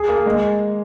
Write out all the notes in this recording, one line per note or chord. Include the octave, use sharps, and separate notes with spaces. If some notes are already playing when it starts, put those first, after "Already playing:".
Already playing: G#4
A#3
G#3